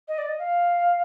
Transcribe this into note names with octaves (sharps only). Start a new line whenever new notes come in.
D#5
D5
D#5
F5